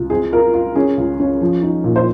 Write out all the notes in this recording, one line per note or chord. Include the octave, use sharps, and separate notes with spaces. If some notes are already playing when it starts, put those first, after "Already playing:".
Already playing: C#2
C4 G#4
F4 A#4
F4
C#4 G#4
C#2
C#4
F3
D#4
A#2
C5